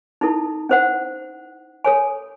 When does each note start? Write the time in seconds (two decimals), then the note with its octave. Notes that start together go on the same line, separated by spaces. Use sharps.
0.21 D#4 E4 A4
0.69 C#4 C5 F#5
1.84 A4 C#5 G#5